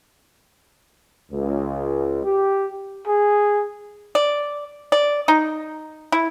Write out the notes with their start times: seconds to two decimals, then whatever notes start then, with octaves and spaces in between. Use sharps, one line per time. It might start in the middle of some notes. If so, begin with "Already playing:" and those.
1.31 C#2
2.24 G4
3.08 G#4
4.15 D5
4.92 D5
5.28 D#4
6.12 E4